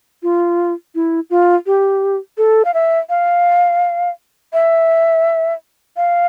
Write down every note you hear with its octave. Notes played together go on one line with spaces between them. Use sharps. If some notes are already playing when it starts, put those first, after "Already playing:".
F4
E4
F4
G4
A4
F5
E5
F5
E5
F5